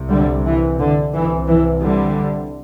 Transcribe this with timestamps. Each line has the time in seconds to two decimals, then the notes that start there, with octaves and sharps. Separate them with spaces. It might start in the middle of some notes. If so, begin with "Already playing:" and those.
Already playing: C2 C3
0.09 D3 G3
0.45 E3
0.79 D3
1.13 C2 C3 E3
1.48 E3
1.81 D3 G3